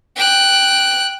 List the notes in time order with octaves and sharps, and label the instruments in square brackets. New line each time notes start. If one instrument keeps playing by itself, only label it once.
[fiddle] G5 F#6